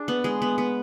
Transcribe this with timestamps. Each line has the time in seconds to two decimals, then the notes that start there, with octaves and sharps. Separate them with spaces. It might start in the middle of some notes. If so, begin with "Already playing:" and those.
Already playing: D4 G#4
0.08 B3
0.24 G#3
0.42 B3
0.58 B3